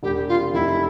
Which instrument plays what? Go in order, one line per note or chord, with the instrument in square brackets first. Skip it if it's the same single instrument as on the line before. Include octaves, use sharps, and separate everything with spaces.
[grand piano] E1 [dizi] G4
[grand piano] C3 [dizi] F4
[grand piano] F1 [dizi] E4